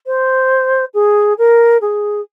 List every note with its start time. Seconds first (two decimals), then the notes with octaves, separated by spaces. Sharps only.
0.06 C5
0.94 G#4
1.38 A#4
1.81 G#4